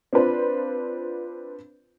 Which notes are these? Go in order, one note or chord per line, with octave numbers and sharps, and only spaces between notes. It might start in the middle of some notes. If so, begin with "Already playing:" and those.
C4 D4 F4 B4 C5